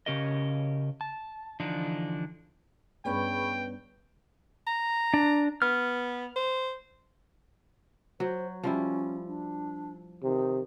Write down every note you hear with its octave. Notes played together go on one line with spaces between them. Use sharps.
C#3 C#4 G4 A#4 D#5
A5
D3 E3 F3 D4 D#4
G2 B3 C#4 G#4 G5 B5 C#6
A#5
D4
B3 F6
C5
F#3 C5
F3 G3 C#4 E4
D4
C3 D#3